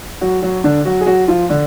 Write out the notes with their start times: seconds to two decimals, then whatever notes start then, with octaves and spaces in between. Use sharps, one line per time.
0.21 F#3 F#4
0.42 F#3 F#4
0.64 D3 D4
0.85 F#3 F#4
1.01 G#4
1.06 F#3 F#4
1.28 F3 F4
1.49 D3 D4